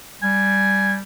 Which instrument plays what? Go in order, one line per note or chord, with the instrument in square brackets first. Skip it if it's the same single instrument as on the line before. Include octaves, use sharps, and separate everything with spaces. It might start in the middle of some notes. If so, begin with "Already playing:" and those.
[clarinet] G3 [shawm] G#5